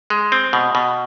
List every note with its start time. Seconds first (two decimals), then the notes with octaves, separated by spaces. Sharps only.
0.10 G#3
0.32 C4
0.53 B2
0.75 B2